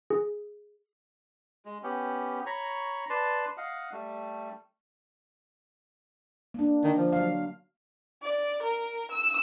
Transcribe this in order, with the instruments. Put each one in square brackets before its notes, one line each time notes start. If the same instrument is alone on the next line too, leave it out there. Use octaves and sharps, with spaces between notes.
[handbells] G#4
[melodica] G#3
B3 C#4 G4
C#5 A#5 B5 C#6
B4 D5 A5 C6
D#5 F5 F#5
G3 A3
[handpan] A#3 D4
[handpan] D3 [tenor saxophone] D#3
[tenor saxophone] F3
[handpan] F#3 F5
[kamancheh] D5
A#4
E6